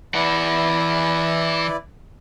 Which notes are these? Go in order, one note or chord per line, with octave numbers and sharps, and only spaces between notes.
E3 E4 B4 D5 F#5